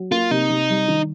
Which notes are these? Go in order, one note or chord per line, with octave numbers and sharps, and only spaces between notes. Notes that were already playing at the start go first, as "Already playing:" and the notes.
Already playing: F#3
A#3 F4
C3 D#4
C3
G3
D#3